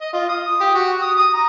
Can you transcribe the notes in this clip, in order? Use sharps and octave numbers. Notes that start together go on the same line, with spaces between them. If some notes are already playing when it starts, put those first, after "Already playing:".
D#5
F4
D#6
G4
F#4
D#6
D#6
A#5